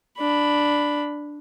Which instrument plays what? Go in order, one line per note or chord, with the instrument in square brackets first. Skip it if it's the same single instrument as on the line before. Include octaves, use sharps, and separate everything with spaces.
[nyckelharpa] D4 B5